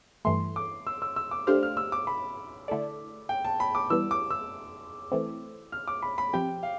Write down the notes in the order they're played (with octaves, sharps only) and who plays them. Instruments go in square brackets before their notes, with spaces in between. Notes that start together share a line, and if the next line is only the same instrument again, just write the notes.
[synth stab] G2 E3 A3 [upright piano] C6
[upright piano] D6
E6
E6
E6
D6
[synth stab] A3 D4 G4 C5 F5 [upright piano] F6
[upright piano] F6
E6
D6
B5
[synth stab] D3 A3 E4 A4 D5
[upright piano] G5
A5
B5
D6
[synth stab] E3 G3 B3 [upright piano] E6
[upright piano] D6
E6
[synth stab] E3 A3 C4
[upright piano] F6
D6
B5
B5
[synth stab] F3 C4 G4 [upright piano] G5
[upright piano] F5